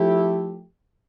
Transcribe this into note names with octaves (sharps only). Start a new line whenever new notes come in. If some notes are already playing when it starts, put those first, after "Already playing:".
Already playing: F3 A3 E4 G4